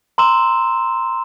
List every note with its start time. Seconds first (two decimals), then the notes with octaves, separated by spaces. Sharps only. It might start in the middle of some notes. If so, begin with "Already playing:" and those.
0.18 A#5 C6 E6 E7